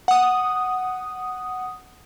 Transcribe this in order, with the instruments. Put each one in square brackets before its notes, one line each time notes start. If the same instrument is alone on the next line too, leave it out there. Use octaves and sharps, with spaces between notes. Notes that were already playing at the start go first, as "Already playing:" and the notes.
[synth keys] F#5 D#6